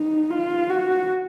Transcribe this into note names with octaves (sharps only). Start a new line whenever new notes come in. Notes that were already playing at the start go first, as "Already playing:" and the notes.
Already playing: D#4
F4
F#4